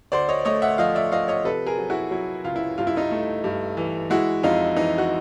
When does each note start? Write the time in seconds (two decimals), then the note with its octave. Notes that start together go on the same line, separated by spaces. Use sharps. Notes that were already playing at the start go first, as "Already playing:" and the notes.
0.12 D2 C5 D5
0.29 C#5 D#5
0.45 A3 C#5 D#5
0.62 E5 F#5
0.78 F3 D#5 F5
0.95 D5 E5
1.12 F3 D#5 F5
1.28 C#5 D#5
1.44 C3 A4 B4
1.66 G#4 A#4
1.78 F#3
1.90 E4 F#4
2.11 F#3 E4
2.44 C#2 F4
2.56 E4
2.78 G2 F4
2.87 E4
2.96 D#4 F4
3.11 A3
3.44 G2
3.77 E3
4.10 G#3 E4 F#4
4.43 F2 D#4 F4
4.76 E3 D#4
4.98 F#4